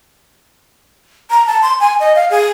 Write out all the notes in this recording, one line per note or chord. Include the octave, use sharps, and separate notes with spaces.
A#5
A5
C6
G#5
D#5
F5
G#4